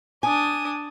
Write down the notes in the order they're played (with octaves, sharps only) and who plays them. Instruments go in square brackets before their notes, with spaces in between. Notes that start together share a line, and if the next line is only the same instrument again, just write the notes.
[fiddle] D4 D#6 [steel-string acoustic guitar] G#5